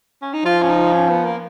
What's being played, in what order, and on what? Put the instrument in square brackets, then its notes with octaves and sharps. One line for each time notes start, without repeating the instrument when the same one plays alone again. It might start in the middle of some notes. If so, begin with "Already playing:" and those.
[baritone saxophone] C#4
D#4
[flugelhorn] F3 [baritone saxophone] F4
[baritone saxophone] C#4
D#4
C#4
B3
A#3